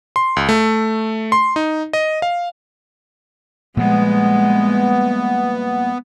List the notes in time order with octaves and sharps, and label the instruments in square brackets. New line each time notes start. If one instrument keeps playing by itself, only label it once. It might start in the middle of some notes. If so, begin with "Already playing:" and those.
[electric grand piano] C6
C#2
A3
C6
D#4
D#5
F5
[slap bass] A#2 F3 G3 [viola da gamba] G#3 [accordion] B3